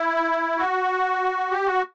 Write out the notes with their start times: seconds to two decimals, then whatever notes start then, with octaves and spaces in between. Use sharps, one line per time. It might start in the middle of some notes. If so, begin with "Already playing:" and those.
Already playing: E4
0.58 F#4
1.51 G4
1.66 F#4